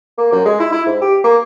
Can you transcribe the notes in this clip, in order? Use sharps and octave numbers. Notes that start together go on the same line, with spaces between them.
A#3
F#2
G#3
E4
E4
G#2
G4
A#3